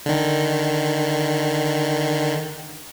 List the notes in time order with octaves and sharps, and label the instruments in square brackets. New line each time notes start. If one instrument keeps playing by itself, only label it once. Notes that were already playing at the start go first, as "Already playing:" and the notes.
[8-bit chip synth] D3 D#3